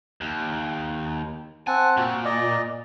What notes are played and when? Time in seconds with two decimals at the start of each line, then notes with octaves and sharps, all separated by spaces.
0.21 D#2
1.67 C4 F#5 G#5 A5
1.97 A#2 F#4
2.25 D5 D#5